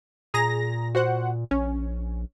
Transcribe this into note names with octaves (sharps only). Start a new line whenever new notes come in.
A#2 G#4 A#5 A#6
F#4 C5 F#5
A#1 C#4